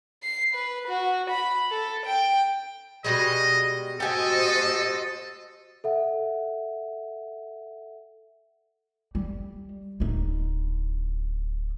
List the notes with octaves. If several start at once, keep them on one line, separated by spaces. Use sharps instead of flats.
C7
B4
F#4
B5
A4
G5
B2 G3 G#3 D#5
F#4 G4 A4 C5 D#5 G#5
A4 E5 F#5
G3
D1 D#4